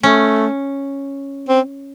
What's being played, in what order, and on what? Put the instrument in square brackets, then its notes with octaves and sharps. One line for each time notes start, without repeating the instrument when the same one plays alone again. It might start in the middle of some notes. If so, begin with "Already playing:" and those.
[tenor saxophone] A3 [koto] C#4
[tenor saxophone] C4